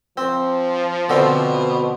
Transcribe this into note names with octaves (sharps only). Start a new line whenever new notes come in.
F3 C4
B2 D3 C4